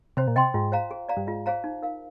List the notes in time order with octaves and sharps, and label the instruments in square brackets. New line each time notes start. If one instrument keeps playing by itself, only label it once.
[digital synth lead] C3 [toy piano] C5
[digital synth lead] A#2
[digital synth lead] C3 [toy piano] D#5 G5 C6
[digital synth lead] G#2 [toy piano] F4
[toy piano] C5 F5 A#5
G#4
D5 F5 A#5
[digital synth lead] G2
[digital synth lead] G#2 [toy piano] F4
[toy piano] G#4 C5 F5 A#5
D#4
A#4 F5